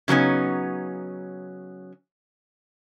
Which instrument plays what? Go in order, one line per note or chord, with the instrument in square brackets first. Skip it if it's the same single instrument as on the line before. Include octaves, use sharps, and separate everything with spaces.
[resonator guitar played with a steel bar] C#3 F#3 B3 C#4 D#4